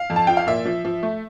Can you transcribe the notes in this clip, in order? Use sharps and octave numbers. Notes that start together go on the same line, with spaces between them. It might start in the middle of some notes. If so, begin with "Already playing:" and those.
Already playing: F5
F2
A5
F3 G5
F5
A#2 E5
F3
F3
A3